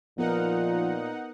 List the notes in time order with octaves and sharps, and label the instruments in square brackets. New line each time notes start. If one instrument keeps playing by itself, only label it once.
[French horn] A#2 [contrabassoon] F3 [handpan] B3 A#4 [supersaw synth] D#4 F#5